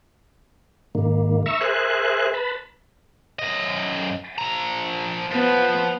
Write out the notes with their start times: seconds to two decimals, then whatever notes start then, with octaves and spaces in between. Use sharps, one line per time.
0.95 G#2 D#3 A#3
1.46 E5 A#5 C#6 E6
1.61 G#4 A#4 C5 E5 G#5 F#6
2.34 B4 A5 B5
3.39 F#2 D#5
4.38 F3 A#5
5.31 F3 B3